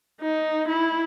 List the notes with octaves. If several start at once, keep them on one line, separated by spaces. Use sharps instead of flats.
D#4
E4